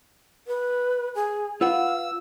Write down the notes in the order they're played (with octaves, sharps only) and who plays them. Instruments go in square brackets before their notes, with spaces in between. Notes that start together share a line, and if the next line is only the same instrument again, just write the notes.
[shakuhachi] B4
G#4
[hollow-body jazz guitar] F4 B4 F#5 [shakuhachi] F5 [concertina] E6